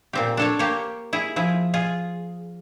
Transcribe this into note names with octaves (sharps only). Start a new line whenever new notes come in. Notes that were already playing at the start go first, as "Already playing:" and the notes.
A#2 C4 G4
D4 A4 C#5
A#3 G4 C5 C#5
E4 G#4
F3 E4 G#4
F4 G#4